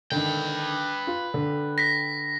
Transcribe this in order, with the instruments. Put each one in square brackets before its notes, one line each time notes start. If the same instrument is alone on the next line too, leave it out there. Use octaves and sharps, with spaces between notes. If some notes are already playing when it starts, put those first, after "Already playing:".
[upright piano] D3 D#3 [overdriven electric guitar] B4 G5
[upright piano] F4
D3
[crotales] A#6 B6